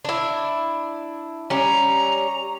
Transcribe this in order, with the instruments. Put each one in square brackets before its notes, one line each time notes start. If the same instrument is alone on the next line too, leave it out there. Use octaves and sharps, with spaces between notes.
[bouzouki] D4 E4
[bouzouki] G3 C#4 [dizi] A#5